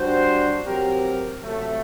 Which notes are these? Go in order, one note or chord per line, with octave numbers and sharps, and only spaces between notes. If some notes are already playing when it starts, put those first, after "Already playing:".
Already playing: G3 D4 F#4 C5
F#3 C4 G4 A#4
C3 F#3 A3